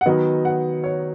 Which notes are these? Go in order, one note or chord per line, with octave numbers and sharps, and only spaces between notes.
F#5
D#3 F#3 B3 D#5
F#5
C#5